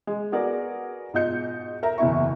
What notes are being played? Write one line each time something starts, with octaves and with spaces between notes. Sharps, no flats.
G#3
B3 F#4 G#4 A#4 D5
G#2 B2 F4 D#5 G6 C#7
A#4 E5 A#5
F#1 E2 E4 E5 C#6